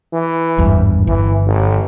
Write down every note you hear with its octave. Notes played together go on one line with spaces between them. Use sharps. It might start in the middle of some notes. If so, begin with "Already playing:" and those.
E3
G#1 E2 G2
G1 E3
A1